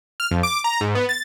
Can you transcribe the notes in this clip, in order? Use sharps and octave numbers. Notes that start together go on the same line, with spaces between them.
F6
F2
D6
A#5
G#2
B3
A6